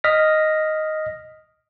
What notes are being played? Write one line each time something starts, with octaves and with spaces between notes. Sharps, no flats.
D#5 F6 A#6 B6